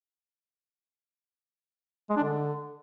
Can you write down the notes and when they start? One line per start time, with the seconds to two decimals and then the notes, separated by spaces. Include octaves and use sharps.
2.10 G#3
2.17 D4
2.24 D3